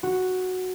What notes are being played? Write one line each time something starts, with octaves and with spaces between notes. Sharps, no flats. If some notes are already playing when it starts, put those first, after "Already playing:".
F#4